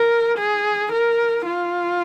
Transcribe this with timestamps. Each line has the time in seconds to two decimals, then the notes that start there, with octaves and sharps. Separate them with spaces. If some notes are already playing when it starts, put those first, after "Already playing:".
Already playing: A#4
0.38 G#4
0.92 A#4
1.46 F4